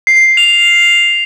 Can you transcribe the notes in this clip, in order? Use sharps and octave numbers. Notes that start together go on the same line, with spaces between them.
C7
F7